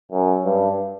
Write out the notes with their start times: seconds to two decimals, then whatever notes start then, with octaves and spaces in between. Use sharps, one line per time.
0.12 F#2
0.45 G2